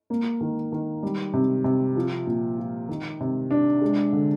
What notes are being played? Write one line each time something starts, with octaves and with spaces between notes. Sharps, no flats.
A#3
D#3
D#3
G3
C3
C3
F3
A#2
F4
D#3
C3
D4
G#3
D3